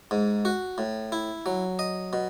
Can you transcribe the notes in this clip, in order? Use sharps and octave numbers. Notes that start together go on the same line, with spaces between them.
G#2
F#4
A2
E4
F#3
D#5
B2